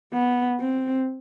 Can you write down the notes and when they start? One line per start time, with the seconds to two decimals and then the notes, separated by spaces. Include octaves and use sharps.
0.13 B3
0.60 C4